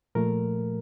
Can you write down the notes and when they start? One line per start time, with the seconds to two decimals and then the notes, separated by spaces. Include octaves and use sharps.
0.15 A#2 F3 A3 A#4